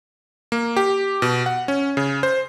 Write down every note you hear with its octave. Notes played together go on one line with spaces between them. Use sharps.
A#3
G4
B2
F#5
C#4
C#3
C5